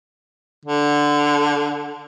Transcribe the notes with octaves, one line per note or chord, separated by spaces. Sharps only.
D3